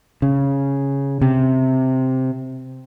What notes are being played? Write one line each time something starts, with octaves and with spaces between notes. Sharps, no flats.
C#3
C3